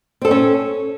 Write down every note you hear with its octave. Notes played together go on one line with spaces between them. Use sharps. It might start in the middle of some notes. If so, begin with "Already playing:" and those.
C4 C#4 D#4 A4